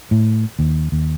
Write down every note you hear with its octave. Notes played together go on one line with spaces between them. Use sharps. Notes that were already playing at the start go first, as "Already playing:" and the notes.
A2
D#2
D#2